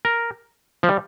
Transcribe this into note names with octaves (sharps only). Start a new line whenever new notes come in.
A#4
F3
G3